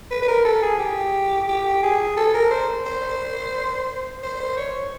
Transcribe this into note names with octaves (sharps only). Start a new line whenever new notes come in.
B4
B4
A#4
A4
G#4
G4
G4
G#4
A4
A#4
C5
C5
C5
C5
C#5